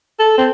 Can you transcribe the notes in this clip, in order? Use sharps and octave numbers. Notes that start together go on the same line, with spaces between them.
A4
C4